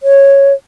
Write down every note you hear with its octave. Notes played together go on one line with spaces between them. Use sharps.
C#5